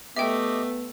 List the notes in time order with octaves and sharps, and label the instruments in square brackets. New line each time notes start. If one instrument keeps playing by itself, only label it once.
[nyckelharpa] A3 [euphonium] B3 [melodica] G4 D#5 [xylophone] E5 G5